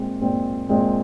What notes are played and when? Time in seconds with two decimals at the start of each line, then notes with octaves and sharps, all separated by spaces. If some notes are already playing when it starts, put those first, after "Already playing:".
Already playing: A#2 G#3 C4
0.21 A#2 G#3 C4
0.69 A#2 G#3 C4